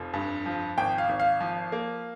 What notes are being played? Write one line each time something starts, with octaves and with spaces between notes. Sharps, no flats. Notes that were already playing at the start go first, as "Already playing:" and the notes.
Already playing: F1 F3
G2
F3
G#1 G5
F5
G#1
F5
F3
A#3